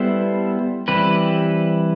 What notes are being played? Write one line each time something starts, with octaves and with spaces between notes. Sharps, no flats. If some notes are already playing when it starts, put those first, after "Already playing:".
Already playing: G3 B3 E4 A4 C5
E3 G3 C4 G4 B4